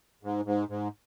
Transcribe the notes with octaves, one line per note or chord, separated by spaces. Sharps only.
G#2
G#2
G#2